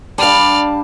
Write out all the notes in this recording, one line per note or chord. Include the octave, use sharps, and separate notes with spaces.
G3 D4 D5 F5 A5 F6